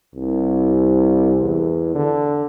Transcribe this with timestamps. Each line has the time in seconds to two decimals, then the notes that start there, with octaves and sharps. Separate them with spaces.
0.15 C2
1.41 E2
1.95 D3